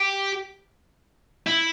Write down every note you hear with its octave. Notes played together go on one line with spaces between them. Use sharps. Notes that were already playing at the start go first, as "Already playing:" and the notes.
Already playing: G4
E4